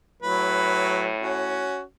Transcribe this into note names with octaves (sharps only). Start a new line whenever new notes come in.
A2 F#3 B4
C#4 F#4